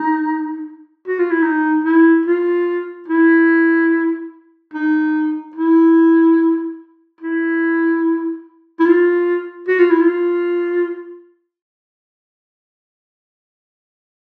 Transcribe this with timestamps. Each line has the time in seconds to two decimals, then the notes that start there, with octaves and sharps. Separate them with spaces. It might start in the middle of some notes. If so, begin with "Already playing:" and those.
Already playing: D#4
1.08 F#4
1.19 F4
1.31 E4
1.43 D#4
1.84 E4
2.26 F4
3.08 E4
4.74 D#4
5.56 E4
7.21 E4
8.80 E4
8.86 F4
9.68 F#4
9.79 F4
9.91 E4
10.01 F4